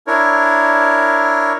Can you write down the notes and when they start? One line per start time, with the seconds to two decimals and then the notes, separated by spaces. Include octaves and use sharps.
0.07 D4 E4 A#4 C#5